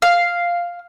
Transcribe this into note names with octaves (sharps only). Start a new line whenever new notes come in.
F5